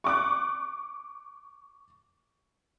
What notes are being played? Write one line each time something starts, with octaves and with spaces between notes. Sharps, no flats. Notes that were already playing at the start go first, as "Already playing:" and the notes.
C#6 D6 F#6